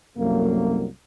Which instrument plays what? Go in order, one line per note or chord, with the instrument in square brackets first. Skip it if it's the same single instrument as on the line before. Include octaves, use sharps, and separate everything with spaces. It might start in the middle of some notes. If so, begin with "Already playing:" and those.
[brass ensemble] C2 F#2 F#3 A3 A#3